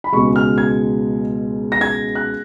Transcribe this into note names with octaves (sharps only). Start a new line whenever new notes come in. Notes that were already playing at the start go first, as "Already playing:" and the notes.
B5
C#2 B2 G#3 C#6
F6
G#6
A#6
G#6
F#6